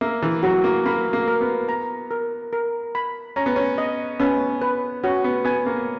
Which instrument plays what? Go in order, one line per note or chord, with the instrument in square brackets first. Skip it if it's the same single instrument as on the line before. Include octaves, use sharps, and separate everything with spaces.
[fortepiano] A#3 [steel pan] E5
[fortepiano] E3
[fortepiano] F#3 [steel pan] F#4
[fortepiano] A#3
[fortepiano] A#3 [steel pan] B5
[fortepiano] A#3
[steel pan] A#4
[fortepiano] B3
[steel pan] A#5
A#4
A#4
B5
[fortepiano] C#4 [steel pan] A#5
[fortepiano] B3
C#4
[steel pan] D#5
[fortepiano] B3 [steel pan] C#4
[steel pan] B4
[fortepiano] C#4 [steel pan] F#4
[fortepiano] B3
[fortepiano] B3 [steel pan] G#5
[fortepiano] A#3